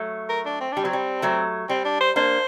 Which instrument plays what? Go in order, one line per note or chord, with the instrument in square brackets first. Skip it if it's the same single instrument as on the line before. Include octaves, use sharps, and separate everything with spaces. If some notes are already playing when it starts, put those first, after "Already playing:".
Already playing: [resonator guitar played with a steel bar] F#3 A3
[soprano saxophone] A#4
D4
C4
[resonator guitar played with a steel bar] G3 [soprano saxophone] D4
[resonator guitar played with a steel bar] F#3 [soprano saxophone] C4
[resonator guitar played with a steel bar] G3
F#3 A3
[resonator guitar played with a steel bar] G3 [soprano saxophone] C4
[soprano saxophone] D4
C5
[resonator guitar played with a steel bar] A#3 D4 [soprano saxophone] C5